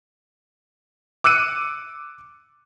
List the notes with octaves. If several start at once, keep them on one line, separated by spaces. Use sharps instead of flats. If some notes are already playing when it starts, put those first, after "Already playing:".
D6 E6 F#6 C#7 D#7